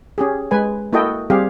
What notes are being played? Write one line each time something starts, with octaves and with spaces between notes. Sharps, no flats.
C#4 G4 G#4
G#3 B4 G#5
A#3 E4 F#4 A4 D#5 G5
G3 C4 G4 G#4 F5